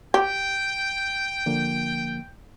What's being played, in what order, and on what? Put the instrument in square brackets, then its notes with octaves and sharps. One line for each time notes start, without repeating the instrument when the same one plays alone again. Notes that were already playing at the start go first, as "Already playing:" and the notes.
[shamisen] G4 [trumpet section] G5
[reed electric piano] D3 F3 A#3